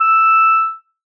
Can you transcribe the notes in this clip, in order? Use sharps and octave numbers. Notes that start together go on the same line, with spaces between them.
E6